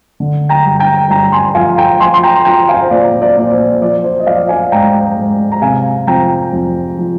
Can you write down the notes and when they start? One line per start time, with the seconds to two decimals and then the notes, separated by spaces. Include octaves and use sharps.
0.20 D3
0.49 G5 A#5
0.65 G2
0.79 G5 A#5
1.10 G2 G5 A#5
1.32 G#5 C6
1.55 F3 F5 G#5
1.77 G5 A#5
2.00 F3 G#5 C6
2.14 C6
2.23 G5 A#5
2.45 F3 G5 A#5
2.68 F5 G#5
2.82 C5
2.91 A#2 D5
3.22 D5
3.37 A#2 D5
3.52 C5
3.81 F3 D5
4.04 C5
4.19 D#5
4.27 F3 D5 F5
4.49 F5 G#5
4.72 G#2 G5 A#5
5.17 G#2
5.52 A#5
5.62 C3 F5 G#5
6.07 F2 G5 A#5
6.53 F2
6.98 F3